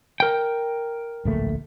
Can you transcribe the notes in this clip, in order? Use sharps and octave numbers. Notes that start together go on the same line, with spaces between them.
A#4 G5
D1 A#1 A3